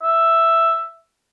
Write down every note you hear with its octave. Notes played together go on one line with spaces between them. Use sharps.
E5